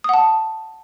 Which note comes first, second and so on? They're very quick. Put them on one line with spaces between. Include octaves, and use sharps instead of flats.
D#6 F#5 A5